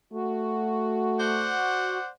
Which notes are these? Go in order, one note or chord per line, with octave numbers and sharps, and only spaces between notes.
A3 F#4
C5 D5 F#5